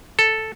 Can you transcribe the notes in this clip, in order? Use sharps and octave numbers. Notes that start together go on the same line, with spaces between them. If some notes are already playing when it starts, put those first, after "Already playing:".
A4